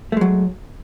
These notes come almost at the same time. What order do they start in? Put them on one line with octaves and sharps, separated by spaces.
A3 G#3 F#3